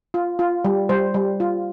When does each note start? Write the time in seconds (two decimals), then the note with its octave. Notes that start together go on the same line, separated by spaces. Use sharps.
0.14 F4
0.39 F4
0.65 G3
0.89 G3 C5
1.14 G3
1.40 F4